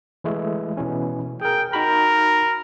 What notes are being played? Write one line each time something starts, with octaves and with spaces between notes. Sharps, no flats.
E3 G#3 A3
B2 E3 C#4
G#4 A#4 G5
D#4 F#4 A#4 B5